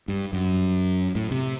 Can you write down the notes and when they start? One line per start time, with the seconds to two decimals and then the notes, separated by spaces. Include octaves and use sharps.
0.08 G2
0.33 F#2
1.15 A2
1.31 C3